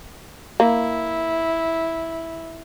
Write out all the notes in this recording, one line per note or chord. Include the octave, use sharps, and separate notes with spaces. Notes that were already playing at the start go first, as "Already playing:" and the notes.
A#3 E4